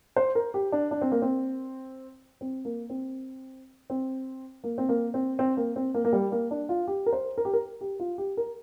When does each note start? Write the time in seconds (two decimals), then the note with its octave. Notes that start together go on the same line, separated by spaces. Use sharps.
0.16 C5
0.35 A#4
0.54 G4
0.72 D4
0.91 D4
1.02 C4
1.12 A#3
1.22 C4
2.41 C4
2.65 A#3
2.90 C4
3.90 C4
4.64 A#3
4.78 C4
4.89 A#3
5.14 C4
5.39 C4
5.57 A#3
5.76 C4
5.94 A#3
6.05 A#3
6.13 G3
6.32 A#3
6.51 D4
6.69 F4
6.88 G4
7.06 A#4
7.13 C5
7.38 A#4
7.45 G4
7.53 A#4
7.81 G4
8.00 F4
8.18 G4
8.37 A#4